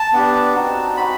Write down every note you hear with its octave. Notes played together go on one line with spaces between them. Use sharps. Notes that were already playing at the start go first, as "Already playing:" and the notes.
Already playing: A5
B3 D4 G4
C4 D#4 F#4
C4 D#4 F#4 B5